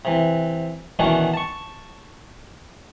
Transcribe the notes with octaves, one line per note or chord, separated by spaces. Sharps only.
C3 E3
B2 D#3 E3 C#4 D4 F#4
A5 C#6